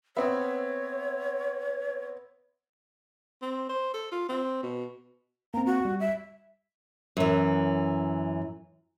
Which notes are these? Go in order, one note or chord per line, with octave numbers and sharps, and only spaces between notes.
B3 C4 C#5 E5
C4
C5
A4
F4
C4
B2
A#3 C4 A#5
F#4
G3
E5
F#2 E3